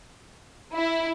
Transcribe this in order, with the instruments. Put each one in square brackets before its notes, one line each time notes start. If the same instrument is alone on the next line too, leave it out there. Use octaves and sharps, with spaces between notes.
[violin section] E4